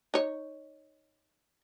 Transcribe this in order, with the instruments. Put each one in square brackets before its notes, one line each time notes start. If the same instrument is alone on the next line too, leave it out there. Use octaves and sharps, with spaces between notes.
[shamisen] D#4 C#5